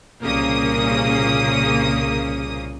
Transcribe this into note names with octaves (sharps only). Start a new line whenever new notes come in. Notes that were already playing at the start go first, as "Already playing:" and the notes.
C2 A#2 C#3 A#3 D#6